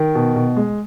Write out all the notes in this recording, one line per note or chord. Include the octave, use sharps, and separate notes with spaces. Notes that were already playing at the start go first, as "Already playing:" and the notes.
Already playing: D#3
B2
B2
G#3